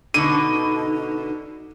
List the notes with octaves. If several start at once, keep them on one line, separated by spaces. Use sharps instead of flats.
B2 D3 D#4 D#7